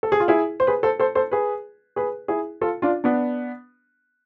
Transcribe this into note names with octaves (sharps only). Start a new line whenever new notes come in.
A4
G#4
F4
E4 G#4
C5
G#4 B4
A4 C5
A4 C5
A4 C5
G#4 B4
G#4 B4
E4 G#4
F4 A4
D4 F4
B3 D4